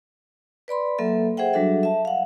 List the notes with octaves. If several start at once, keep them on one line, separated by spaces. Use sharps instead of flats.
B4 D5 B5 C6
F#3 A#3 A4 E5
G#4 C5 E5 F#5 G5
F#3 G3 D4 F#4 A4 E5
E5 A5
F5 F#5